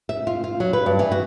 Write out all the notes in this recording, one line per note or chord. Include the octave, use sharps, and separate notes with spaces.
E5
F4
F4
F#3
B4
G2
E3
F#4